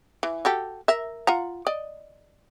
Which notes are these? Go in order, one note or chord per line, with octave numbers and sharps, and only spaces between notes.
E3
F#4 G4 A4
A#4 E5
F4 F#5 A#5
D5 D#5